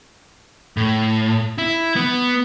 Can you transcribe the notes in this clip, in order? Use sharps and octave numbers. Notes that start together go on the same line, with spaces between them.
A2
E4
B3